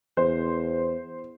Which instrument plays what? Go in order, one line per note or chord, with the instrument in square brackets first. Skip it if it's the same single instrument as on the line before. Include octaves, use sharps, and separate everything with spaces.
[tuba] E2 [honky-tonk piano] C5